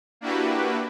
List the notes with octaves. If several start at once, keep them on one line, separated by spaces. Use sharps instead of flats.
A#3 D4 E4 F#4 G4 B4